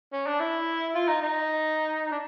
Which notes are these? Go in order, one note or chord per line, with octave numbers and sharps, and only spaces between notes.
C#4
D4
E4
F4
D#4
D#4
D4